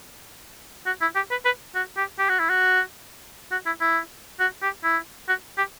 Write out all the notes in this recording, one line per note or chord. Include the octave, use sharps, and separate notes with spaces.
F#4
E4
G4
B4
B4
F#4
G4
G4
F#4
E4
F#4
F#4
E4
E4
F#4
G4
E4
F#4
G4